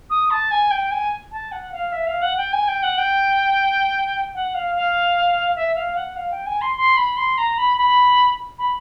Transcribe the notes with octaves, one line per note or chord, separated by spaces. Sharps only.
D#6
A5
G#5
G5
G#5
A5
F#5
F5
E5
F5
F#5
G5
G#5
G5
F#5
G5
F#5
F5
F5
E5
F5
F#5
F5
G5
G#5
C6
C6
B5
C6
A#5
B5
B5
B5